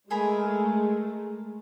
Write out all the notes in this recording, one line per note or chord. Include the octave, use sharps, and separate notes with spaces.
G#3 A3 G#4 A#4 B5